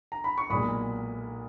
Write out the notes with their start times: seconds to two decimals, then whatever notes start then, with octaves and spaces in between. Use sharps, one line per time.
0.12 A#5
0.24 B5
0.38 C#6
0.50 B1 A#2 G#3 B5 D#6